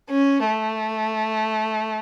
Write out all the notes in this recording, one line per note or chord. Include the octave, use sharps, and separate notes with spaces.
C#4
A3